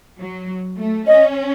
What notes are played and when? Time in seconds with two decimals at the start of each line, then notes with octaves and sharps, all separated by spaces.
0.19 F#3
0.78 A3
1.07 C#4 D#5